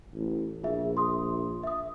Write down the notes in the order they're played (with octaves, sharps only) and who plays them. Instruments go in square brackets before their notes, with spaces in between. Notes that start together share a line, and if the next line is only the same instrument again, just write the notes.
[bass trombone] A1
[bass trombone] A#1 [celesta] F4 G#4 E5
[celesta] C6 D#6
E5 D#6